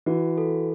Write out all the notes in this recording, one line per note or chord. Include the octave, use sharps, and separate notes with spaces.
E3 F#4
A4